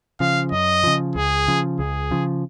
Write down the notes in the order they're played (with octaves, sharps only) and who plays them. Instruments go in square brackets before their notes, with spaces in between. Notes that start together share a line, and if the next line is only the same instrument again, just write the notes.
[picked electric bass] C#3 F3 [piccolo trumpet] F5
[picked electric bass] F#2 [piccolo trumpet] D#5
[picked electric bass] C#3 F3
[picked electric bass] C#2 [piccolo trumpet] G#4
[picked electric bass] C#3 F3
[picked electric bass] C#2 [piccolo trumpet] G#4
[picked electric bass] C#3 F3